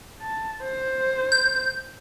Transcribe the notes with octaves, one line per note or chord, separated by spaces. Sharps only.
A5
C5
G6